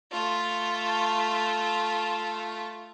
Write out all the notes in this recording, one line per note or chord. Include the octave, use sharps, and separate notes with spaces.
A3 F4